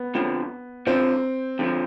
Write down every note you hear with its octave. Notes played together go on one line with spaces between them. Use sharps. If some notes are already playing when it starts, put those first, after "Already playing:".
Already playing: B3
F2 D3 F3
F2 D3 F3 C4
F2 D3 F3